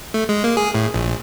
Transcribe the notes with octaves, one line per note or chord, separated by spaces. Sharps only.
A3
G#3
A#3
G#4
A2
A#1